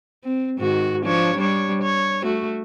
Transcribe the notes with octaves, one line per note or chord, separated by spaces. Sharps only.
C4
G#2 D#3 F#4
F3 D4 C#5
G3 D4 C#5
C#5
A3 F#4